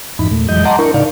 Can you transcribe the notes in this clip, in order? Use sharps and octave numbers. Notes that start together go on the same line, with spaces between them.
F2 G#2 E3 D#4 B5
E2 A#2 A3
F2 E3 F#3 G#3 D#5 G6
D#5 F#5 A5 A#5 C6 D6
D4 E4 A#4 C#6
A2 C#3 D#4 D5 F5